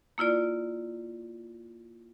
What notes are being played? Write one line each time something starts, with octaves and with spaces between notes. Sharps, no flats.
A#3 E4 F4 D5